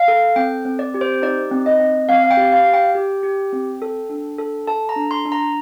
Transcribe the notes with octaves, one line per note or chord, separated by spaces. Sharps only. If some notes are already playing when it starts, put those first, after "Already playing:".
Already playing: F5
A4
C4 G5
C4
D5
G4
C5
D#4 D5
C4
D#5
C4
C4 F5
F5
G5
G4
F5
G4
G5
G4
G4
C4
A4
D4
A4
A4 A5
A#5
D4
C6
D4
A#5